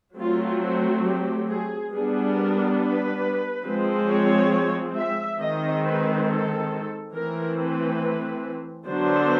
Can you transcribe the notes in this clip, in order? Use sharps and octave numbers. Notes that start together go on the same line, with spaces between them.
F#3 A3 C4 F4
F#4
G4
G#4
G3 B3 D4 G#4
A#4
B4
F3 G#3 C4
C#5
E5
D#3 G#3 C4 D#5
B4
A4
E3 A3 C4 A#4
B4
D3 F#3 B3 D4 C5